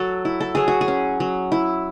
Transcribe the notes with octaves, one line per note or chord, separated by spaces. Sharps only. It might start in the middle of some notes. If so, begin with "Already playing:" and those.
Already playing: F#3 F#4 A4
E4
A4
F#3 G#4
F#4
G#4
C#4
F#3
E4